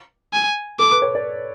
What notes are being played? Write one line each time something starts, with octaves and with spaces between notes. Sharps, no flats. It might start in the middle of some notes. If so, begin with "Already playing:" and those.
G#5
A4 D6
B4
C#5
D5